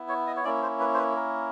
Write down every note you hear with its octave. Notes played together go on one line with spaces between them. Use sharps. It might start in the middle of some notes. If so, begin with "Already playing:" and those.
Already playing: B3 E4
C#5
D#5
C#5
A#3 C#4 E4 D5
C5
B4
C5
B4
A#4